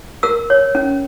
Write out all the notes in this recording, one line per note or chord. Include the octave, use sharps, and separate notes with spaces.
A#4 E6
C#5
C#4